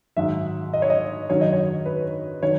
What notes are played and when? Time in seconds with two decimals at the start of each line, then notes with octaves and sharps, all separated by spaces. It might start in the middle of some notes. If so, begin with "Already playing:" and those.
0.17 G#2 D#3 F#3 E5
0.73 D#5
0.82 C#5
0.90 D#5
1.29 F#2 D#3 F#3 C#5
1.41 D#5
1.53 C#5
1.86 B4
2.42 D#3 F#3 C#5